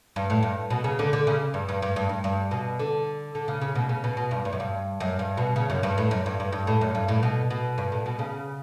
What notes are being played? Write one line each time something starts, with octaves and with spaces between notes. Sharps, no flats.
G2
A2
G2
B2
C#3
D3
D3
C#3
G2
G2
G2
G2
G2
G2
B2
D3
D3
C#3
C#3
B2
C#3
B2
B2
G2
G2
F#2
G2
F#2
G2
B2
C#3
F#2
G2
A2
F#2
G2
G2
G2
A2
F#2
G2
A2
B2
B2
G2
A2
B2
C#3